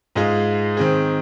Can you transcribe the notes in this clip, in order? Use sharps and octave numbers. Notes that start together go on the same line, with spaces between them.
G#2 G#3 F4 G#4
D#3 C4 G#4